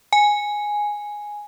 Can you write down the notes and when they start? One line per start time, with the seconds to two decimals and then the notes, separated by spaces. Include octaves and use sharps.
0.13 G#5